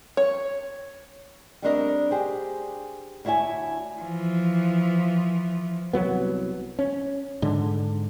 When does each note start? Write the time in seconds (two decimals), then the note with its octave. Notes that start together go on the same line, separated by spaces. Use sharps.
0.17 C#5
1.62 G3 A3 C4 D4 A#4 D#5
2.11 G4 G#4 C5
3.25 D2 E4 C#5 E5 G#5
4.01 E3 F3
5.93 C2 F#3 B3
6.79 C#4
7.42 G#2 D3